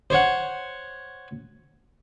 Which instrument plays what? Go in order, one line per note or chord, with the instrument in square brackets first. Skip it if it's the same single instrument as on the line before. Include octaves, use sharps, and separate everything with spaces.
[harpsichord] C5 C#5 F#5